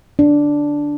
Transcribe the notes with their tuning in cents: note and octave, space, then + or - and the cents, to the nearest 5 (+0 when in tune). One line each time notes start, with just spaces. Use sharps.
D4 -5